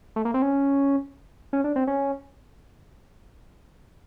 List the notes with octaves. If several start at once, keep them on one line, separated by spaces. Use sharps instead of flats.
A3
A#3
C4
C#4
C#4
D4
C4
C#4